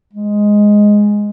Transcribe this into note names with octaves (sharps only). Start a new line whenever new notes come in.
G#3